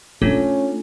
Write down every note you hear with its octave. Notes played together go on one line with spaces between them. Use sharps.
A3 C#4 D4 F4 A4